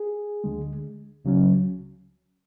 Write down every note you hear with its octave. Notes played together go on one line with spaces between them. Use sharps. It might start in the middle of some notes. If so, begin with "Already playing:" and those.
Already playing: G#4
D2 D3 G#3
C#2 C#3 F#3 C#4